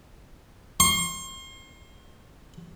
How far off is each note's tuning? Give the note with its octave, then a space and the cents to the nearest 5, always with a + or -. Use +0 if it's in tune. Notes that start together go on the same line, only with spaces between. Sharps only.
C6 +35